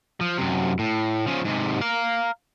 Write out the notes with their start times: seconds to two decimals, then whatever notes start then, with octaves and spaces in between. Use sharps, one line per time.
0.21 F3
0.38 F#2 C3
0.79 A2
1.27 C#3 F3
1.45 G#2 C3
1.81 F5 A#5